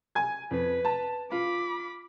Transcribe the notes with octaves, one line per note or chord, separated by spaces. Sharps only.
G#5 G#6
F2 B4
A5
F4 B5 D6